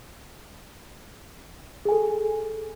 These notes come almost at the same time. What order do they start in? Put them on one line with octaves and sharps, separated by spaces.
G#4 G#5 A4